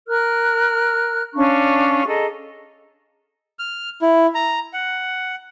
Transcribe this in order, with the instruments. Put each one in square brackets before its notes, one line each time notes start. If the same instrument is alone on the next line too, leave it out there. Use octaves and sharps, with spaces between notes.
[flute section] A#4 F6 F#6
C#4 D4 F5 C#6
G#4 A4 D#5 A#5
[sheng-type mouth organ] F6
E4
A#5
F#5